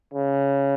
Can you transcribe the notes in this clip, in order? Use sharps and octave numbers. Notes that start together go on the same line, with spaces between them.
C#3